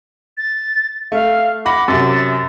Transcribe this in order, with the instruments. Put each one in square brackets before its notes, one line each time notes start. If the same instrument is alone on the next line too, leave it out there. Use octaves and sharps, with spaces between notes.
[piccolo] A6
[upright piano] A3 [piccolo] F5
[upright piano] F#5 B5 A#6 [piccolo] D6
[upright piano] F#2 C3 [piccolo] A6